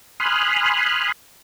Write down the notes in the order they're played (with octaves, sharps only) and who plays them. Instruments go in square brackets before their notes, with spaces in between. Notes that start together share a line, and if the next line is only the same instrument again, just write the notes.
[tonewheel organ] G#5 B5 C6 D#6 F6 F#6